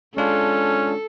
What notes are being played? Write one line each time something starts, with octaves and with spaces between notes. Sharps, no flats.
G#3 C#4 D4 F4 A4